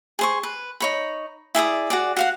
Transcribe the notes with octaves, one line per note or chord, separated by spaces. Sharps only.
G#4 C5 C#6
B4
D#4 C#5 B5
E4 G#4 D5 D#6
F#4 G#4 D5
F#4 F5 F#5